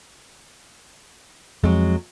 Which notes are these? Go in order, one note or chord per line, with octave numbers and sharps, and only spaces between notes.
F2 F#3 G#3